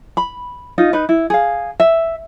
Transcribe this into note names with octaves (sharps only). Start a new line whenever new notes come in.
B5
D#4 F4 D#5
D#4 B4
E4
G#4 F5
E5